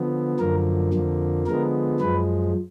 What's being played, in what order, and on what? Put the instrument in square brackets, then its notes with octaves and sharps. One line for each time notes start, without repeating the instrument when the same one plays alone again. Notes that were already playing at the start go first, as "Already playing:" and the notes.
Already playing: [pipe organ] D3 F3 B3
F#2 D3 F3 A#3 A#4
F2 D3 F3 A#3
D3 F3 G#3 B3 A#4
F#2 F3 G#3 B4